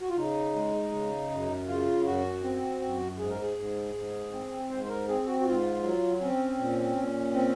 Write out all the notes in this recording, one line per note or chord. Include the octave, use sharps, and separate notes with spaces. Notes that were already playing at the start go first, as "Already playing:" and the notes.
F#4
F4
C#3 D#4
G#3
C#3
F#2
C#3 F4
F#2 F#4
C4
F#2
G#2 G#4
A#4
G#4
G#2
G#2
C4
G#2 C5
C5
A#4
C4 G#4
F#4
F#4
G#2 F4
F#3
C4 C#4
A#2
A#2
C4